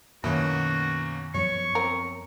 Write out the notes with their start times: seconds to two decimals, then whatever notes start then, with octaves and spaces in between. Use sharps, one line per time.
0.24 F#2 B2 D#3 A#3 C#4 E4 F#4
1.34 F#2 F3 B3 C#5 C#6
1.75 C4 A#4